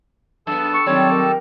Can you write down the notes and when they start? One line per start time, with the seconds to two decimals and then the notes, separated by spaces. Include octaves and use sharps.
0.47 F#2 B3 A4 A5
0.73 C#6
0.86 D#3 F#3 G3 C4 C#5 C#6
1.11 A#4